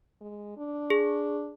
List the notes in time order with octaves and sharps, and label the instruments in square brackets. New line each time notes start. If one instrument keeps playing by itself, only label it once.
[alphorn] G#3
D4
[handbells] G#4